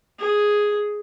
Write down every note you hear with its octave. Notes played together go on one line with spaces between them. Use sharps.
G#4